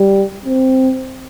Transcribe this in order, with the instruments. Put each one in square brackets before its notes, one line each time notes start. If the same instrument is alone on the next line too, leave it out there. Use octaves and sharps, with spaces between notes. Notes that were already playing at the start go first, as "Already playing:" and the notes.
Already playing: [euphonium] G3
C4